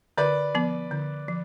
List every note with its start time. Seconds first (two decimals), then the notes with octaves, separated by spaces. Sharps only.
0.18 D3 B4 D5
0.55 F3 B3
0.91 D3
1.28 F3